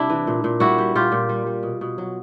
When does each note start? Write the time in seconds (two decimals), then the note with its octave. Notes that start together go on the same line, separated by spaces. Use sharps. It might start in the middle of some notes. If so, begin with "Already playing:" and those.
Already playing: C3 G3 D4 E4
0.10 E3
0.27 A#2
0.44 A#2
0.60 G3 E4 F#4
0.78 G3
0.95 A#2 F4 G4
1.12 A#2
1.29 G3
1.46 G3
1.63 B2
1.81 B2
1.98 F#3